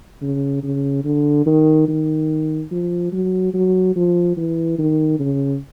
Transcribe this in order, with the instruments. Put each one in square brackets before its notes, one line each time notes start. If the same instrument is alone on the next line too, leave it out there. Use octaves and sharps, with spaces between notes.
[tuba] C#3
C#3
D3
D#3
D#3
F3
F#3
F#3
F3
E3
D#3
C#3